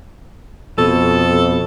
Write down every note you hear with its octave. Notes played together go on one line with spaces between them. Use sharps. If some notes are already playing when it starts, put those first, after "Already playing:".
F2 B2 A4